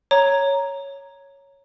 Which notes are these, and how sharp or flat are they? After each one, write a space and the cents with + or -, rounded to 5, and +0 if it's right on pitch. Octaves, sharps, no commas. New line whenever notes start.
C#5 +0 A#5 +0